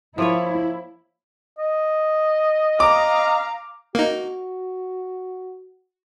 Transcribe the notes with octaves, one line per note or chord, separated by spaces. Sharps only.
F3 A#3 E4 C#5
D#5
F5 A#5 D6
A#3 D#4 F#4